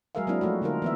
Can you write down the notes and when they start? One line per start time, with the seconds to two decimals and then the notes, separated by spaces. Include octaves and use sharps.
0.15 F#3 G#3 G#4 A#4 E5 F5
0.27 F#3 A#3 C4 D4 E4
0.41 F3 G#3 A3 F#4
0.62 D3 D#4 F4 A#4
0.82 E3 B3 E5